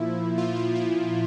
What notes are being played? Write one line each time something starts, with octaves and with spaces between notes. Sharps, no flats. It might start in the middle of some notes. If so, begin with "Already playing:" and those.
Already playing: A#2 F3 E4
A#2 F3 F4
F4
E4